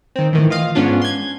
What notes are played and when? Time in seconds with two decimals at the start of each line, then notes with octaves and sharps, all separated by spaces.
0.16 D#3 C4
0.33 A2 D#3 E3
0.50 F4 D#5 F5
0.75 G#2 B3 C#4 D4 F4
1.02 C6 G#6